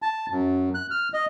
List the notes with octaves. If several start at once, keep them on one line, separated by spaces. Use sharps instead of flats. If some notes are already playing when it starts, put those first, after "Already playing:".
A5
F#2
F#6
F6
D#5